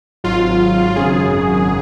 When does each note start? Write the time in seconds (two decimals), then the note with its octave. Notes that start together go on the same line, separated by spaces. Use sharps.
0.24 G#1 G#2 F#3 F4
0.96 G#1 F#2 C#3 F#3 G#4